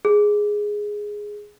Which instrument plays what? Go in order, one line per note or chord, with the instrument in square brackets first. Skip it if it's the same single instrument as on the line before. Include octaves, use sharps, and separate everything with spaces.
[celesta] G#4